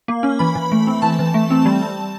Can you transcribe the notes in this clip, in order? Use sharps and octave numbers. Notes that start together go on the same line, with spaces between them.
A#3
C#4
E3 B5
E3
A3
C4
E3 A5
E3
A3
C4
G3